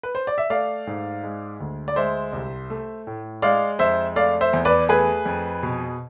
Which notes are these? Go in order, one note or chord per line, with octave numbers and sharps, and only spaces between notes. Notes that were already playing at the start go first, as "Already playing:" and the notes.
B4
C5
D5
E5
A3 D5 F5
G#2
G#3
D2
D5
G#3 C5 E5
C2
A3
A2
G#3 D5 F5
F2 C5 E5
A3 D5 F5
C5 E5
E2
B4 D5
A3 G#4 B4
F2
B2